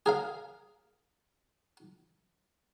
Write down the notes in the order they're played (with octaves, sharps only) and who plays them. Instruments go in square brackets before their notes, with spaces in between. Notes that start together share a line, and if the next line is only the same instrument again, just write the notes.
[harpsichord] G#4 A#4 F5